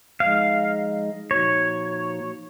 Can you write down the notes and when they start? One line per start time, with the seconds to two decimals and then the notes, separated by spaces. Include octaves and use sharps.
0.20 F3 G#3 D#4 G#4 D#5 F5
1.31 A#2 F3 A#3 D#4 F#4 C#5